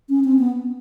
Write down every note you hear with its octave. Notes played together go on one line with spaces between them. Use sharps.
C#4
C4
B3